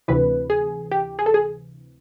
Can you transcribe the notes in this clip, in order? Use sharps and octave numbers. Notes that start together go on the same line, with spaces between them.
D2 C3 E3 B4
G#4
G4
G#4
A4
G#4